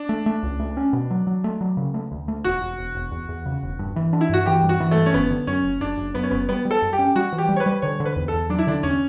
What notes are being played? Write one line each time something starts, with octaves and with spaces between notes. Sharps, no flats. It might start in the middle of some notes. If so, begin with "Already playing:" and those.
Already playing: D4
A3
A3
C#2
A3
C#4
B2
F#3
F#3
A3
F#3
C#3
A3
D2
A3
E1 F#4
E1
E1
E1
E2
E2
C#3
E1
G2
E3
D4
E4
G2 F#4
E3 G4
G2
F#4
E3
A3
G2
C#4
F#1 B3
D3
F#2 C#4
F#1
F#1 D4
F#1
F#2 B3
C#4
F#1 B3
G3 B3
G3
A4
F#2
G4
C#4
G3 F#4
E3
G4
G3
C#5
B4
G3
D3 C#5
D3
B4
E2
A4
E2
F#3 D4
E4
D3 D4
E2 C#4